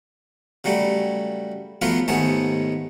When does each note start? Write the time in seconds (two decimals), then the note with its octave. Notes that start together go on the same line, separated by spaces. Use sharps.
0.64 C#3 F#3 G3 A3
1.82 F3 F#3 A3 B3 F4 B4
2.08 D#2 G#2 A3 B3 G#4 A5